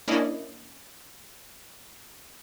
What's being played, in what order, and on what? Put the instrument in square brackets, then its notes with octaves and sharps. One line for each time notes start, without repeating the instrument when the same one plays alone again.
[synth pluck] A#3 C#4 D4 E4 D5 D#5